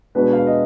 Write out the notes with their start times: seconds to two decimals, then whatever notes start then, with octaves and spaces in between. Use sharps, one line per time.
0.15 B2 G#3 B3 D4 B4
0.33 F5
0.47 D#5